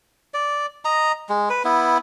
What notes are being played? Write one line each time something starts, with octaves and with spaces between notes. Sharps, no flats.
D5
D#5 A#5
G#3
B4
B3 E4